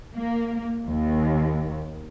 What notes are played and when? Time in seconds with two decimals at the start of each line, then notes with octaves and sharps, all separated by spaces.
0.14 A#3
0.87 D#2